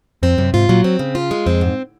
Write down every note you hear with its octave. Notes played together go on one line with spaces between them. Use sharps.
F2 C4
F#2 C3
G#2 F4
A#2 F#3
C4
C#3
F4
G#3
F2 C4
G#2